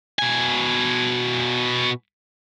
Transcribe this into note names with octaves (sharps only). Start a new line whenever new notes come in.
B2 G#5